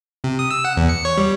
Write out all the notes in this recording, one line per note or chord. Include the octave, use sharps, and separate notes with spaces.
C3
D#6
E6
F#5
E2
C#7
C#5
G3